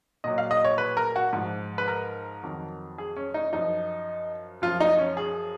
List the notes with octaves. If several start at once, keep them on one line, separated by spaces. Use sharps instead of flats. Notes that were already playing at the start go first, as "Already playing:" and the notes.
A#2 F#3 D#5
F5
D#5
C#5
B4
A#4
F#4
G#2 F3
B4
A#4
F2 D#3 F#3
G#4
C#4
D#4
F#2 F3 D#4
F#2 F3 F4
D#4
C#4
G#4